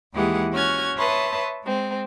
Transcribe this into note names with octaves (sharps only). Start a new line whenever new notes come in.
D#2 E3 G#3 G4 G#4 F#5
C#4 F#4 F6 G#6
B4 C#5 E5 A5 C6 D#6
G#3 C4